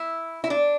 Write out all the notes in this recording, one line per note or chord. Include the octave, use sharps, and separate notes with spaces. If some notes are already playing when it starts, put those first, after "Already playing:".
Already playing: E4
E4
D4